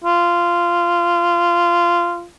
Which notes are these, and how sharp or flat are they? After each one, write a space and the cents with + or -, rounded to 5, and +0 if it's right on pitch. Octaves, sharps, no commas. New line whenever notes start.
F4 -15